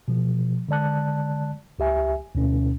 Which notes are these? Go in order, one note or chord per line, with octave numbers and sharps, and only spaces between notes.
B2 F3
D3 G#3 D5 A5 F#6
C#2 G4 E5 G#5
D2 B2 C#4